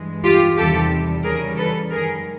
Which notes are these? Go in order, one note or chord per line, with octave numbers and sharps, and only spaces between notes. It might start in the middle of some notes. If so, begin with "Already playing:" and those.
Already playing: G2 E3 G#3
F4 G4
E2 C3 D#3 G3 G4 A4
E2 C#3 E3 G3 G#4 A#4
A4 B4
F#2 D#3 G#3 G#4 A#4